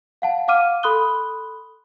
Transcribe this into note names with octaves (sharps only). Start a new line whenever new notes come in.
F5 F#5 A5
F5 F#5 D6 F6 D#7
A4 B5 C6 D#6 F#6 G7